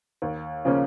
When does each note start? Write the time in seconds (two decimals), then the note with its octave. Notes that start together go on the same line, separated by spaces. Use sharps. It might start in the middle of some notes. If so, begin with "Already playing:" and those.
0.22 D#2
0.65 C#3 F3 A#3 C#4